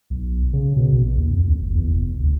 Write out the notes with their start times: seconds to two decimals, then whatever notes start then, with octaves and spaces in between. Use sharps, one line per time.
0.10 B1
0.53 C#3
0.76 B2
0.92 A#1
1.17 D#2
1.31 F2
1.46 D2
1.59 F#1
1.75 E2
1.92 F1
2.19 D2